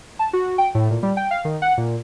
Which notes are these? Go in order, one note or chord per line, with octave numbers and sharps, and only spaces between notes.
A5
F#4
G5
A2
A#2
G3
G5
F5
D#3
F#5
A#2